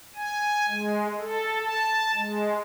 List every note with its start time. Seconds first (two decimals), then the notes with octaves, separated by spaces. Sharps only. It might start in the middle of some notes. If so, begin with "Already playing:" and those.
0.15 G#5
0.69 G#3
1.20 A4
1.63 A5
2.15 G#3